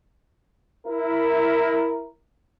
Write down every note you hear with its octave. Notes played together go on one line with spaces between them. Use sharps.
E4 A#4